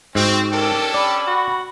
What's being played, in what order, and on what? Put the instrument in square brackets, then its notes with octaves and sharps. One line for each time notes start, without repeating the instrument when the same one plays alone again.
[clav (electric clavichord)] G#2 [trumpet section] C4 [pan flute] F#4
[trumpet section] C#4 D4 A4 [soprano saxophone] G4 [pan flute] A#4
[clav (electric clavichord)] D5 [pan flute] B5
[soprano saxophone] F#4